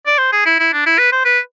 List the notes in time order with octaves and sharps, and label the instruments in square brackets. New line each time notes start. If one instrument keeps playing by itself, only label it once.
[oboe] D5
C5
G#4
E4
E4
D4
E4
B4
C5
B4